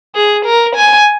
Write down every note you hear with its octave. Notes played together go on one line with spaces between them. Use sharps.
G#4
A#4
G#5